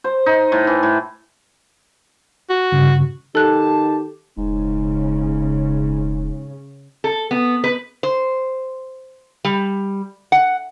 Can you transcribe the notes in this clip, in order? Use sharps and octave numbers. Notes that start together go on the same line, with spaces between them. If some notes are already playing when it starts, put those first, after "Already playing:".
C5
D#4
A2
E3
A2
F#4
G2 C#3
D#3 G4 A4 A5 F#6
E1 G#2 C#3
A4
B3
B4
C5
G3
F#5